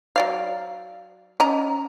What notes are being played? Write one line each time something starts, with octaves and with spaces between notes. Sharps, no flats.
F#3 D5 F5
C#4 D#5 A#5